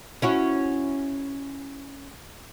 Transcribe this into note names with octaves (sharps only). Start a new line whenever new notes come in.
C#4 E4 F#4